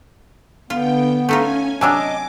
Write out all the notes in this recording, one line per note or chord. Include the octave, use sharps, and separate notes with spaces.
D3 B3 F4 G5
A3 C#4 D#4 F4 G#5
C3 F#3 D4 D#5 G#5 D6 E6